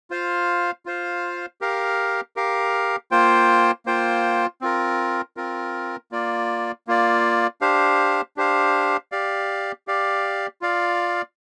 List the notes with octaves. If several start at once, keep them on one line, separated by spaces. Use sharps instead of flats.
F4 C5 F5
F4 C5 F5
G4 A#4 F5
G4 A#4 F5
A#3 F4 C5 G5
A#3 F4 C5 G5
C4 F4 A#4
C4 F4 A#4
A#3 F4 D5
A#3 F4 D5
D4 G4 C5 F5
D4 G4 C5 F5
G4 D5 F5
G4 D5 F5
F4 D5 F5